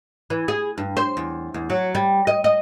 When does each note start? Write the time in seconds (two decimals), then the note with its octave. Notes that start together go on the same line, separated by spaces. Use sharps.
0.30 E3
0.48 G#4
0.78 G2
0.97 C5
1.17 E2
1.54 E2
1.70 F#3
1.95 G3
2.27 D#5
2.44 D#5